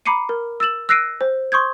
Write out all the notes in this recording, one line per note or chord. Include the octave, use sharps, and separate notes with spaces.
A#5 B5 D6 C7 C#7 D#7
A#4
E6 A6 E7 F#7
E6 F#6 A#6 C7 D7 D#7
C5
C6 C#6 D#6 G6 G#6